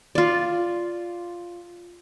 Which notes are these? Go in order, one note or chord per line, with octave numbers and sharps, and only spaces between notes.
F4 D5